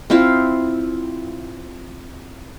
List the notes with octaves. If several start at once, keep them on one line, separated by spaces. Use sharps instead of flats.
C4 E4 F4 F5